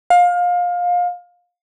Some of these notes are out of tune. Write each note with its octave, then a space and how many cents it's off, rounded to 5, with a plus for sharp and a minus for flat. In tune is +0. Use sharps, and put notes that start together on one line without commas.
F5 +25